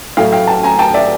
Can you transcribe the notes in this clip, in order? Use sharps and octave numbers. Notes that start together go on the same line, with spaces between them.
A2 F#3 A3 F5 G5
F5 G5
G5 A5
G#5 A#5
G5 A5
D5 E5